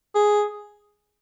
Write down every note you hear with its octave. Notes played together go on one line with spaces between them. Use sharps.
G#4